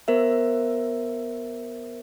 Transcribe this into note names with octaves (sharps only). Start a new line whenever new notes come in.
B3 A#4 C5 E5